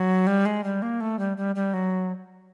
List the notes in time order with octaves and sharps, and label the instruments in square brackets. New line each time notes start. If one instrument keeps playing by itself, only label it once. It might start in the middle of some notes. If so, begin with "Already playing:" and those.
Already playing: [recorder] F#3
G3
G#3
G3
A#3
A3
G3
G3
G3
F#3